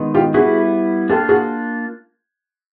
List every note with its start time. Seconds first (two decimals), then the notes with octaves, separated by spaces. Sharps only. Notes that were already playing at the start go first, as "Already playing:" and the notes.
Already playing: D#3 G#3 B3
0.14 F4 G4
0.34 G3 B3 E4 F#4 G#4
1.09 A#3 D4 F4 G4 A4
1.29 F#4 G#4